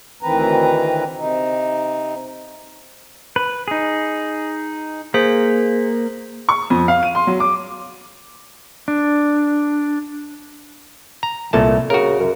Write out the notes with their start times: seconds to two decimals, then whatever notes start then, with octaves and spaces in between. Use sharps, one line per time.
0.23 D2 D#3 E3 C4 B4 A#5
1.16 C3 D#4
3.36 B4
3.68 D#4 G#4
5.14 A#3 G#4 C5 B6
6.49 C#6
6.70 F2
6.88 F5
7.03 D#7
7.15 C6
7.27 F#3
7.40 D6
8.88 D4
11.23 A#5
11.53 C2 A#2 A3 A5
11.90 C#3 F#4 A#4
12.19 F#2